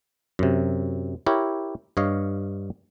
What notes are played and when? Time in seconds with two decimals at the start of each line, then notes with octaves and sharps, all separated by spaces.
0.39 F#2 C3
1.26 E4 G4 A#4 C#5
1.97 G2 C#5 D#5 F5